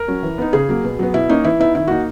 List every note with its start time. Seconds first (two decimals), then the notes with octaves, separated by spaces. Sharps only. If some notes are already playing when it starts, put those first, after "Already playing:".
Already playing: A#4
0.08 F#3 C#4
0.23 E3
0.38 B3 D#4
0.53 C#3 G#4
0.69 F#3 A#3
0.84 B2
0.99 F#3 B3
1.14 B2 E4
1.29 A#3 C#4 D#4
1.44 E3 E4
1.60 B3 D#4 E4
1.75 D#3 E4
1.88 A#3 D#4 F#4